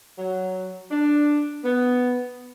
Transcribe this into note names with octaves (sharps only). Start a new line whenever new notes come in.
F#3
D4
B3